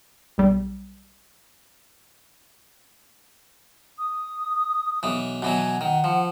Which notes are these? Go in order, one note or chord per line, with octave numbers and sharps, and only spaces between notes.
B1 G3
D#6
B1 E3
B2 E3 F#3 G#5
D#3 F#5
F3